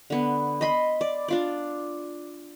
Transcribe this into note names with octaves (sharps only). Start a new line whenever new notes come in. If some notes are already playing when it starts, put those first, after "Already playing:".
D3 B3
D#5 B5 C6
D5
D4 F4 D5